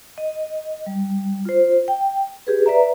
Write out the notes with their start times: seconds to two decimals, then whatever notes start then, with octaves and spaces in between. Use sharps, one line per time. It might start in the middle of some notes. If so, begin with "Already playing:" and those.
0.18 D#5
0.87 G3
1.45 F4 C5
1.88 G5
2.47 G4 G#4 B4
2.66 B4 D5 E5 A#5